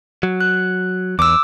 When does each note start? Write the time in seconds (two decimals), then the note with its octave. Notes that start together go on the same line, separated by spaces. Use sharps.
0.23 F#3
0.40 F#6
1.19 E2 D6 E6